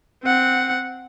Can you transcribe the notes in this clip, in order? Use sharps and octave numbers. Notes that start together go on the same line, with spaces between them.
C4 F#5